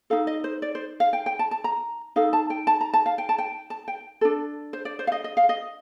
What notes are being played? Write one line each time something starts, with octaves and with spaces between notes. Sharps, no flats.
D#4 A4 F5
D#5
C5
D5
C5
F5
G5
G5
A5
A5
A#5
D#4 A4 F5
A5
G5
A5
A#5
A5
F5
G5
A5
G5
A5
G5
D4 A4
C5
D5
C5
F5
D#5
D#5
F5
D#5